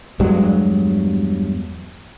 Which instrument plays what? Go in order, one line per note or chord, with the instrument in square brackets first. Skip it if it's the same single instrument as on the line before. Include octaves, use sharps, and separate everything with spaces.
[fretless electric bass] E2 G2 F#3 G#3